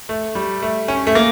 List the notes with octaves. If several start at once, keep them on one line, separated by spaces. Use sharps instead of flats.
A3
G3
A3
C#4
A3
A#3